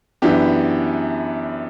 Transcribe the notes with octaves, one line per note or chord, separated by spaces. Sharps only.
F#2 E3 B3 D4 G4